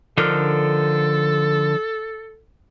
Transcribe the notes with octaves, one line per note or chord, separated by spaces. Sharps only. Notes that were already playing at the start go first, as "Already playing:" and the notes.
D3 F3 D4 D#4 A4 A#4 F6